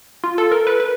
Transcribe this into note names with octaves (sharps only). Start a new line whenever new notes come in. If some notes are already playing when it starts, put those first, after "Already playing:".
F4
A4
A#4
B4
B4